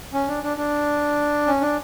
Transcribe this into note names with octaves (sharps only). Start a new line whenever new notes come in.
C#4
D4
D4
D4
C#4
D4